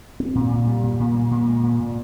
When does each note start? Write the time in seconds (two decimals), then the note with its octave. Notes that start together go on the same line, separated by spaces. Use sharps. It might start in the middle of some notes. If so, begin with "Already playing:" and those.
0.20 C4
0.35 A#2
0.51 A#2
0.67 G3
0.84 A#2
1.00 A#2
1.15 A#3
1.31 A#2
1.48 G#3
1.63 A#2
1.80 A#2